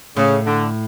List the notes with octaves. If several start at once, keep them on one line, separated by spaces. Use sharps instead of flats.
A2 C#3
D3